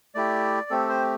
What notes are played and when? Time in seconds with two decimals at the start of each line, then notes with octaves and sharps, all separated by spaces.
0.14 A3 E4 G4 D5
0.70 A3 C4 G4 A4
0.89 C5